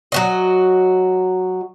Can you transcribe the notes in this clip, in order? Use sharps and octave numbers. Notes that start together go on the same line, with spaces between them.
F#3 F#4 D#5